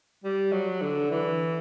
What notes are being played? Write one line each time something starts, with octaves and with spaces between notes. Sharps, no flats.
G3
F#3
D3
E3